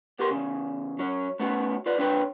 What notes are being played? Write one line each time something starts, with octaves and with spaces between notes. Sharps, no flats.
B3 G4 A#4 C6
E2 C#3
F#3 C#4
A3 B3 C#4 F#4
F4 B4 D5
D3 C4 D4 B4 C#5 G5